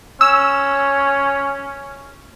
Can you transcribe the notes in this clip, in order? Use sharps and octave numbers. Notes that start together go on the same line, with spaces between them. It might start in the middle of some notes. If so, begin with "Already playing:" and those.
C#4 E6